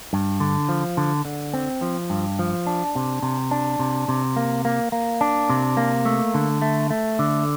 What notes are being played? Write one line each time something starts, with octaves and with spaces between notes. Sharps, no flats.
G2
D3
F3
D3
D3
C4
F3
G2
F3
D4
C3
C3
D4
C3
C3
A#3
A#3
A#3
D4
C3
A#3
A3
D3
A3
A3
D3